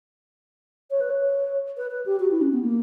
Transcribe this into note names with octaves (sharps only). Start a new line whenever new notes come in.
C#5
B4
C#5
B4
B4
G4
F#4
E4
C#4
B3
A#3